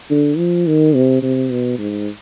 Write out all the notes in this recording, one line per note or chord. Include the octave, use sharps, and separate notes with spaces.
D3
F3
D#3
C3
C3
B2
G#2